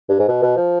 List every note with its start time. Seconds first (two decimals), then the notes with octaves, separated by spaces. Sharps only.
0.09 G2
0.19 G#2
0.28 B2
0.42 B2
0.57 F3